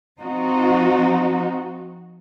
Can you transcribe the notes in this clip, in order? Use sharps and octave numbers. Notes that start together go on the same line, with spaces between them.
F3 C4 D#4 F#4